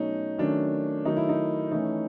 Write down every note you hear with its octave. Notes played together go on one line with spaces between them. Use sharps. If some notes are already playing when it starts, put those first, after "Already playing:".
Already playing: B2 F#3 A3 C#4 D#4
D#3 F#3 A3 C#4 D4
D#3 F#3 A3 D#4
E4
D#4
E3 A3 C#4 D#4